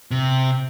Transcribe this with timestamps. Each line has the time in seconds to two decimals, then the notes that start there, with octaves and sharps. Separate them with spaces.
0.11 C3